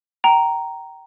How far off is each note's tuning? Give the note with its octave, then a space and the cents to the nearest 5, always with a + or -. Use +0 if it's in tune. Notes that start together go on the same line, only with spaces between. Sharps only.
G5 -25 A#5 +0